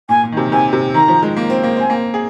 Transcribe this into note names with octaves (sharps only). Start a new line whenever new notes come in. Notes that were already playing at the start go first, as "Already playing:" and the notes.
A#2 G#5
A#2
D#3
C3
D#3
C3 G#5
C3
D#3 A#5
F3
G#3
A#3
C4
A#3
C4 G#5
A#3
G#4